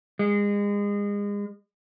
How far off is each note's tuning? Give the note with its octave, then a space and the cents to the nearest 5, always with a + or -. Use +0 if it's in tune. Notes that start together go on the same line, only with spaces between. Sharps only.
G#3 -30